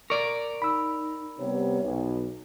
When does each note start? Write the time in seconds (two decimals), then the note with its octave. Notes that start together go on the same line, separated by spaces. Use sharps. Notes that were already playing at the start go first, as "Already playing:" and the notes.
0.10 A#4 D5 C#6
0.62 D#4 B5 E6
1.39 C3 G3 B3 C#5
1.83 B1